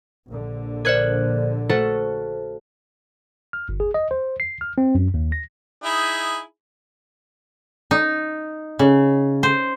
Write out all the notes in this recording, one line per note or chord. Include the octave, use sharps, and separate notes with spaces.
A#1 D3
A#4 C5 D5 F#6 G#6
A3 F#4 A4 C5
F6
G1
G#4
D#5
C5
C7
F6
C4
F#2
D#2
A#6
D#4 E4 G#4
D#4
C#3
C5